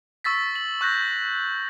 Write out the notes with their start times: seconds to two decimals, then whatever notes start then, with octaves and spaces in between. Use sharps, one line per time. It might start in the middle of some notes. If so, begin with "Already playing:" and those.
0.24 C#6 E6 A6 B6
0.56 F#7
0.81 C#6 F#6 G6 A#6